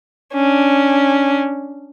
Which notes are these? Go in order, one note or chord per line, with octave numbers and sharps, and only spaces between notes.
C#4 D4